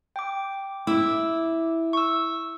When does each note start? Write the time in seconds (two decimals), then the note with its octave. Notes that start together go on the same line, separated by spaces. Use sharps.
0.16 G5 D6
0.87 E4 D6 E6
1.93 C#6 E6